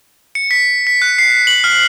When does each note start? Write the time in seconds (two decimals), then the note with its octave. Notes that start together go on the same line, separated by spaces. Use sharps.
0.35 C#7
0.51 B6
0.87 B6
1.02 F#6
1.18 C7
1.47 F#7
1.64 F6